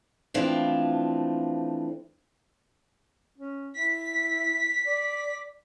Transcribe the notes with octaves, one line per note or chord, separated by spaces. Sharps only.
E3 F3 A3 C4 D4 F4
C#4
E4 B6
D5